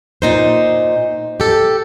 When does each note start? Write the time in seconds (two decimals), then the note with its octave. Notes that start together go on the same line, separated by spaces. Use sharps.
0.22 A#2 D#4 C5
1.40 G4 A4